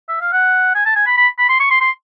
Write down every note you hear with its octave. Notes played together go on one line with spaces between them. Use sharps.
E5
F5
F#5
G#5
A5
G#5
B5
B5
B5
C6
C#6
C6
C6